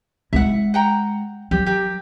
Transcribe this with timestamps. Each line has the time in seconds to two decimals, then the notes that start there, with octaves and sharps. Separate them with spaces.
0.33 G#3 E4 E5 F#5
0.74 F#5 G5 A#5
1.51 F#3 G4
1.66 G4 A#4